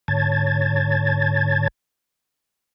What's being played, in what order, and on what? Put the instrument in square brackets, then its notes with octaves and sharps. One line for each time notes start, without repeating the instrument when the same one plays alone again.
[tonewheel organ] G#2 D3 C#5 A5 G#6 A6